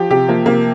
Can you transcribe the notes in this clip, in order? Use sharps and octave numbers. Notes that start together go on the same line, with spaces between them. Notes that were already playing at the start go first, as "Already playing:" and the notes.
Already playing: F3 G4
C3 G4
F3 A#3
C3 A#3